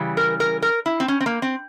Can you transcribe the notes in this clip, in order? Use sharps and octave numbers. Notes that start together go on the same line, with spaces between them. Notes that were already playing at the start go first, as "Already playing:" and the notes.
Already playing: C#3 E3 G3
A#4
A#4
A#4
E4
C4
C#4
C4
A#3
C4